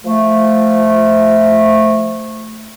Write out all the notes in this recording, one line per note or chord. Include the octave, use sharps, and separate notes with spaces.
F3 A3